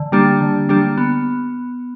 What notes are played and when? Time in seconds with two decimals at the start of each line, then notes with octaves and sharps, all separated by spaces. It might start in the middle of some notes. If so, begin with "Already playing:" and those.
Already playing: D3
0.12 G3 A#3 D4 G4
0.41 D3
0.69 G3 A#3 D4 G4
0.98 B3